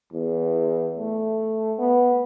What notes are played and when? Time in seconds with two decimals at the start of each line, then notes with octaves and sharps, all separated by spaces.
0.12 E2
0.97 A3
1.79 B3